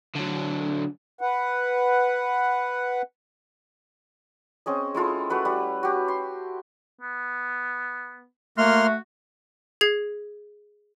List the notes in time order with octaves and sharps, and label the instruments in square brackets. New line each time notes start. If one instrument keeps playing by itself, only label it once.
[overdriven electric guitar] D3 F#3
[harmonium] B4 F#5
[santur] C4 C#4 G#4 D#5
G#3 E4 F4 A4
A3 F#4 B4 F#5
G3
F#4 G4
C6
[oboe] B3
[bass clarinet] A3 [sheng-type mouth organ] A#3 C6 F6 [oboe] F#4
[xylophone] G#4 G#6 C7